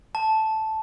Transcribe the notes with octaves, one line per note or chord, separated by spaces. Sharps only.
A5